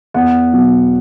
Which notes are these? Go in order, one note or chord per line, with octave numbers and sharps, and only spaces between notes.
E2 F#5
B2 F#3